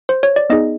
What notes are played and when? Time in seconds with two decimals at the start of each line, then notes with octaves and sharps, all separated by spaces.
0.09 C5
0.23 C#5
0.36 D5
0.50 B3 D#4 G#4 D#5